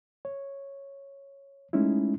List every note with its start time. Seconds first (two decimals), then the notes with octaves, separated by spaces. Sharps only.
0.25 C#5
1.73 G#3 A3 C#4 D#4 E4